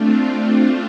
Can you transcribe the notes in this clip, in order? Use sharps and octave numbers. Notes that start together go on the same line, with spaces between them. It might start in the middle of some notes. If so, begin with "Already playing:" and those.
Already playing: A3 C4 D4 F4